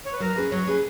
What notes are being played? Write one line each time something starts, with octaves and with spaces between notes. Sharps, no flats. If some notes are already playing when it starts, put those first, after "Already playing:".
C#5
B4
F#3 A#4
C#4 G#4 B4
F#3 C#5
C#4 G#4 B4